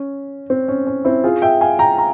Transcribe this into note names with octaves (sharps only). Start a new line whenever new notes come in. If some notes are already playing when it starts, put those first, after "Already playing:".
Already playing: C#4
C4
C#4
C#4
C4 E4
F4 G#4
E5 G5
F5 G#5
G5 A#5
A#5